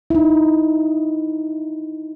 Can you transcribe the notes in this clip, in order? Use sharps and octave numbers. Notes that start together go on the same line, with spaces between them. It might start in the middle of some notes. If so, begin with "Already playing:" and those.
D#4 E4